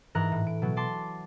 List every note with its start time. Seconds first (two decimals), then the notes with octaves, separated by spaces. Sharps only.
0.15 G#2 E3 A#4 A#5 F#6
0.32 A2
0.47 D7
0.62 B2 F#3
0.77 A5 C6 D6